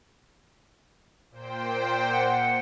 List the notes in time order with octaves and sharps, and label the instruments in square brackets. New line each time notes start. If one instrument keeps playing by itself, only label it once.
[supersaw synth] A#2 C5 G5
[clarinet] F#5